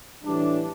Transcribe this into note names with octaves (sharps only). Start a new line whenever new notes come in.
A2 E3 G3 D4